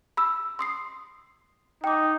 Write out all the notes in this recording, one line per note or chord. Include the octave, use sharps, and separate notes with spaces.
B5 E6
C6 D#6 C7
D#4 G5 D6